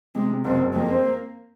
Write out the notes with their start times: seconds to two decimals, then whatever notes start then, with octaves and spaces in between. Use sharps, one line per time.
0.15 C3 G#3
0.30 C3
0.45 F#1 C4
0.59 F#1
0.74 F2 A#3
0.90 C4